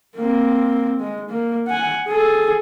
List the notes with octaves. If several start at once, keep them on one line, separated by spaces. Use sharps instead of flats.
A#3 C4
G#3
A#3
F#5 G#5
G#4 A4